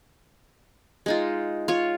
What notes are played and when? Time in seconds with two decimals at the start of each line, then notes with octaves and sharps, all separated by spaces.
1.06 G#3 D#4 F4
1.68 F4 C#5